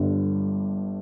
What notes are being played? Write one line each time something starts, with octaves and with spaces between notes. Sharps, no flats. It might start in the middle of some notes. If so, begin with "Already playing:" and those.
Already playing: G1 G2 D3